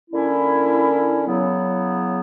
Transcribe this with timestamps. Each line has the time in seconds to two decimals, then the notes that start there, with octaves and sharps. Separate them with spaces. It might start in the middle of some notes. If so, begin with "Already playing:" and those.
0.10 D3 A#3 C#4 E4
1.25 C#3 F#3 B3 E4